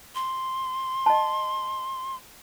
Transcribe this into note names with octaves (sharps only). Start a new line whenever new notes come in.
C6
D#5 A5